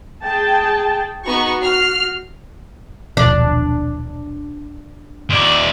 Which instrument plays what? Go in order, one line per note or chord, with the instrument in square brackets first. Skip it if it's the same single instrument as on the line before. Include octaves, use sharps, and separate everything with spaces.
[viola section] G#4 G5 A5
[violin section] B3 D#4 C#6 [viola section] F#4
[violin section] F6 C7
[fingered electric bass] D#1 B1 F3 [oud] D4
[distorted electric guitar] D#2 D5